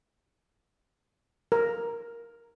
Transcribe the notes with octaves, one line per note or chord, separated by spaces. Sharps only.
A#4